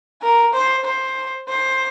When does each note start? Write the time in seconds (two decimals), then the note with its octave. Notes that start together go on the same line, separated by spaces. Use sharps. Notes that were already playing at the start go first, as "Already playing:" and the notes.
0.22 A#4
0.54 C5
0.85 C5
1.49 C5